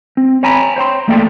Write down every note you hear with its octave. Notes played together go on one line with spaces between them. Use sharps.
C4
C#5 G5 G#5 A#5 B5
C5 C#5 G5 C6
E2 A3 A#3 A4 D5 G5